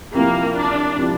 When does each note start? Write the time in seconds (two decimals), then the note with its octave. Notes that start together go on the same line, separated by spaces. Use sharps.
0.14 C3 F3 A#3 C4 E4 A#4
0.56 D4
0.97 C3 F3 C4 E4 A#4